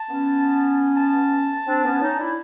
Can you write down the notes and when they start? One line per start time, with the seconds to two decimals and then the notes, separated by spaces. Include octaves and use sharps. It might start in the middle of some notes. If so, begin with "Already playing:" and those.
Already playing: A5
0.09 B3 C#4
0.97 A5
1.67 C4 D4
1.84 B3 C#4
2.02 C#4 D#4
2.19 D4 E4